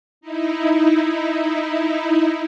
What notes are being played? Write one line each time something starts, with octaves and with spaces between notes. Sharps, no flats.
D#4 E4